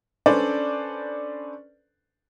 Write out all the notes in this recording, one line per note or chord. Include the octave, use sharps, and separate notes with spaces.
C#4 D4 A4 B4 C5 D5